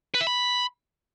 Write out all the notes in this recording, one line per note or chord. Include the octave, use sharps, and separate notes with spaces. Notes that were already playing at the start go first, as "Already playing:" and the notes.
B4
E5
B5